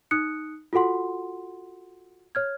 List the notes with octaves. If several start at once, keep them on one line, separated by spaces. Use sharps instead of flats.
D#4 D#6 F#6 C#7
F4 F#4 A4 F#5 C6
C#5 F6 G#6